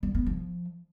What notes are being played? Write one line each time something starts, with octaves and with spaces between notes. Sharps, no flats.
G3
B3
F3